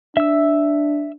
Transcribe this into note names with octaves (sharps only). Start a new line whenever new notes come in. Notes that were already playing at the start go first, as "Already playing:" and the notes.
D4 E5 E6